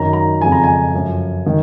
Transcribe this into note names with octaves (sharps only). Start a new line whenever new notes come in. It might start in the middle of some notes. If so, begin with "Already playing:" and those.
Already playing: F#2 D#3 F#3 A#5
A#5
F2 C#3 F3 G#5
A#5
G#5
F#2 F3
D#3